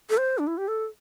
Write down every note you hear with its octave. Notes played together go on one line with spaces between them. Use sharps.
A4
C5
D4
E4
G4
A4